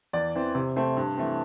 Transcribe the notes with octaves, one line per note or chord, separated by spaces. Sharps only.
E2 D5
E3 C4
C3
A3 C4
G2
E3 A3 C4